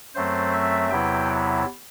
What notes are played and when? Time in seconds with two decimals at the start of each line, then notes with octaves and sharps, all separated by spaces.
0.15 F#2 F#3 A3 C4 C5
0.53 E5
0.90 E2 C3 F#3 B3 E4 G5